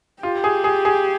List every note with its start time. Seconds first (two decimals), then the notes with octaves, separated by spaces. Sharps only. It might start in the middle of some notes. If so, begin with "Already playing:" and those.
0.23 F4 G4
0.44 G#4
0.64 G#4
0.85 G#4